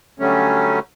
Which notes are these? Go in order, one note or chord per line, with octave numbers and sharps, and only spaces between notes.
D3 F#3 G3 A3 C#4